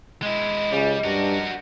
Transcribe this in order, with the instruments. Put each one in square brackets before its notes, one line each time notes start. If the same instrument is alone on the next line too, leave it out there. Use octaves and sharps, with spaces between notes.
[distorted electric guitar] G#3 E4 [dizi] D#5
[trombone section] C#2 C#3 [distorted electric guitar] G3
[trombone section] G2 D4 [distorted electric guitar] F#4 A#4